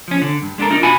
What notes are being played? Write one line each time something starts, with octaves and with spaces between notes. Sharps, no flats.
F3 C#4
D3
G2
G#3 D4 F#4 A4 A#4
D4 D#4 F4 A#4
B2 B3 F#4 G#5 B5